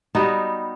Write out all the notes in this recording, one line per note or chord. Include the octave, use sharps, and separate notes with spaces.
G3 B3 D#4 F#4